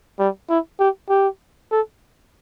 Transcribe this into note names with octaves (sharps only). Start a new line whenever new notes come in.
G3
E4
G4
G4
A4